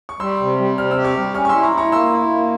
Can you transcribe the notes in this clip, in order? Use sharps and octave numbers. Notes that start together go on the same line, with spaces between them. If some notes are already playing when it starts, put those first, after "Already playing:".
C#6
G3 C6 E6
C3
G3
C3 F6
E6
G4
C#6 F6
G3
C#4 C#6 F6
C#6
C6 E6
E4
A#5 C#6
E4
A#5 C#6
A#3 C6 E6
E4
A#3